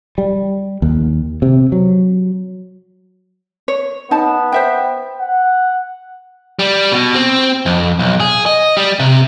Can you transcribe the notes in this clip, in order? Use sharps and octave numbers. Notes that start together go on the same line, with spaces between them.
G3
D#2
C3
F#3
C#5
B3 D#4 A5
C5 E5 G5
F#5
G3
B2
C4
F2
B1
G#4
D#5
G3
C3